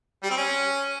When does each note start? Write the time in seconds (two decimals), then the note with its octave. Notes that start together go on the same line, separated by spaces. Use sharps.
0.23 G3
0.30 C4
0.37 C#4